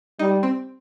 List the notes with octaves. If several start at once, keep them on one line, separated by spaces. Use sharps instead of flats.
G3 D#4
C4